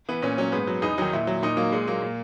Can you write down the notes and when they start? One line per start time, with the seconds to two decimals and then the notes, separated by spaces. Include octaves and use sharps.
0.09 E3 B3
0.22 A#2 C#4
0.38 F#3 C#4
0.52 G#2 B3
0.67 F#3
0.82 E2 D#4
0.98 D#3 F#3 D#4
1.13 A#2 E4
1.27 F#3
1.42 A#2 D#4
1.57 F#3 A#3
1.72 A#2 G#3
1.88 F#3 A#3
2.02 A#2